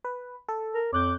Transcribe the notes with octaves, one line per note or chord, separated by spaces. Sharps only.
B4
A4
A#4
F2 C#5 D6 F#6 G6